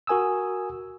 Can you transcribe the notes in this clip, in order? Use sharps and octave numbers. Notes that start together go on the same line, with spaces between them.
F#4 A#4 G#5 D#6 E6